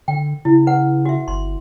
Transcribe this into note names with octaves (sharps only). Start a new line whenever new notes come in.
D3 G5
C#3 E4
B4 F#5
F#4 E5
G1 C6